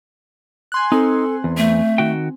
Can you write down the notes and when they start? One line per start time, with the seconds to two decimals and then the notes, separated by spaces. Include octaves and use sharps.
0.72 G#5 C6 F#6
0.92 C4 D#4 A4
1.44 E2
1.57 A3
1.98 D#3 F#4 G5